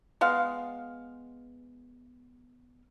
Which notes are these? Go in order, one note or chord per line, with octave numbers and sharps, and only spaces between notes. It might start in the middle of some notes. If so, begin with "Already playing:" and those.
G#3 B3 F5